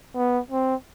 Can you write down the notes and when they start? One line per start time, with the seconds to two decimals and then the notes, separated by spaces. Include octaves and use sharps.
0.15 B3
0.51 C4